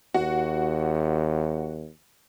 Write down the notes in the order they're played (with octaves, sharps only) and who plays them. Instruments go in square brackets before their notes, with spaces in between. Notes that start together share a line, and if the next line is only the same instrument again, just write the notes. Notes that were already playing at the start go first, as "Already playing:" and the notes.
[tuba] D#2 [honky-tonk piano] F#4